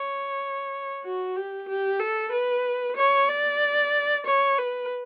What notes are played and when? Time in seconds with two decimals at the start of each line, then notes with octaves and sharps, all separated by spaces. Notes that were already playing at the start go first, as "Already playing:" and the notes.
Already playing: C#5
1.04 F#4
1.36 G4
1.68 G4
1.99 A4
2.32 B4
2.97 C#5
3.29 D5
4.26 C#5
4.59 B4